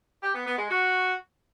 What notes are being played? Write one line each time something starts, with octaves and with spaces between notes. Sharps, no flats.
G4
B3
B3
G#3
F#4